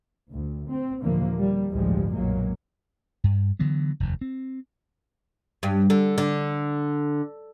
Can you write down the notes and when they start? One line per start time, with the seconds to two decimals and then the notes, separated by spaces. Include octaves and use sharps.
0.30 D2
0.68 C4
1.03 D#2 A#2 D3 E3 F3 A#3
1.39 G3 A#3
1.69 A1 D2 G2 F3 G3 G#3
2.14 B1 F#2 A#2 F#3 G#3 A#3
3.24 G2
3.59 D3 E3 F#3 B3
4.00 F1 D#2
4.21 C4
5.63 G2
5.90 D3
6.18 D3